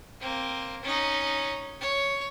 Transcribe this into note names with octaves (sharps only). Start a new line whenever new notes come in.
A#3 C4
C#4 D#4
C#5